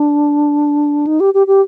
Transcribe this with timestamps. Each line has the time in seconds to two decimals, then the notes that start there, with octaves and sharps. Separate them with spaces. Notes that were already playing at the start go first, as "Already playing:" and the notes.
Already playing: D4
1.07 D#4
1.20 G4
1.34 G4
1.47 G4